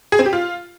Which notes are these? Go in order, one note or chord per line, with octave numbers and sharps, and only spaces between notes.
G#4
C4
G4
F4